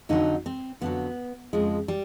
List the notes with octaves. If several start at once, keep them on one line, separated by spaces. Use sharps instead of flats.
F2 D3 F#3 D#4
C4
F2 D3 F#3 B3
F2 C#3 F3 G#3
G3